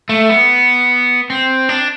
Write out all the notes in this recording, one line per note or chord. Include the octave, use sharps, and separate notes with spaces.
A3
B3
C4
D4